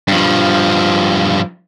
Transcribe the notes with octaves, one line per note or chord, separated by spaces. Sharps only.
G2 F3